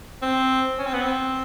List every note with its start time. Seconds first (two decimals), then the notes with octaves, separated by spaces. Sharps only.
0.22 C4
0.78 C#4
0.86 C4
0.93 B3
1.01 C4